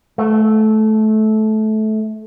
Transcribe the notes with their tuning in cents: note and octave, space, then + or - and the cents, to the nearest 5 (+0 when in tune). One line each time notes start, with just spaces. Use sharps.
A3 -20